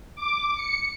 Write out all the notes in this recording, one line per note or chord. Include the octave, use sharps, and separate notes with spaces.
D6
C#7